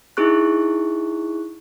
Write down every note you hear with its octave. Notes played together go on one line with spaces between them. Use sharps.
D#4 E4 G#4 C#6 F#6